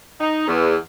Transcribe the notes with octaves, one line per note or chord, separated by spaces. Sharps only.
D#4
E2